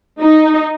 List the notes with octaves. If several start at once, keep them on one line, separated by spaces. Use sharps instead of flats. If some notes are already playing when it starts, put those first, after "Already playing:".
D#4